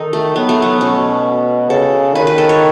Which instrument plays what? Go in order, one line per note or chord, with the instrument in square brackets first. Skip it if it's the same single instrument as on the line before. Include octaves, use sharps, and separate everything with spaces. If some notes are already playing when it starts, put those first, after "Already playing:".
Already playing: [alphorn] D#3 [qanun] D#4 A4
[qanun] A3
[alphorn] F#3 [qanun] B3
[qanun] A3
B3
[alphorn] B2 [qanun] C#4
[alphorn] C#3 [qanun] A4
[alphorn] D#3 [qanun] B4
[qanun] B4
A4
C#5